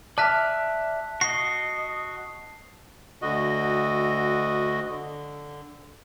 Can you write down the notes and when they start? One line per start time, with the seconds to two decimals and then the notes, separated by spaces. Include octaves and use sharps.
0.18 D5 E5 A5 F6 F#6 B6
1.21 F#4 D#5 C7
3.22 D2 D3 F#4 D#5
4.88 D3